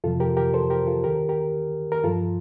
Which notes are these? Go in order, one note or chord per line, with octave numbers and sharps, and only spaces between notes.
F2 C3 F3 F4 A4
G4 A#4
G4 A#4
A4 C5
G4 A#4
F4 A4
D#2 D#3 G4 A#4
G4 A#4
A#4
G2 F3 F4 A4